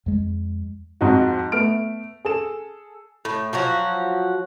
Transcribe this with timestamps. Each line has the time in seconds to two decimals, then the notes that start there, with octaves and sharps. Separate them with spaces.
0.06 F2 G#3
1.01 F2 G#2 D#4 F#4
1.52 A3 B3 F6 D7
2.25 G#4 A4 E7
3.25 A2
3.53 F3 F#3 F#4